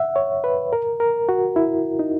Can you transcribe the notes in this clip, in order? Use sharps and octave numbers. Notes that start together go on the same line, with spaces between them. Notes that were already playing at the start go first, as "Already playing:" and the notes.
Already playing: E5 F#5
C#5
B4
A#4
A#4
F#4
E4
D#4